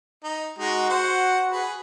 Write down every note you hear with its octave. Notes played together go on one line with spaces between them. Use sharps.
D#4
G#3 D#4 F#4
C5 F#5
G#4 B4